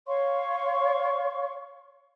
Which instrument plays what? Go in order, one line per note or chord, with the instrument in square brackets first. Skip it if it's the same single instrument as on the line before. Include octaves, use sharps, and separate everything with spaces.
[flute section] C#5 F5 C6 C#6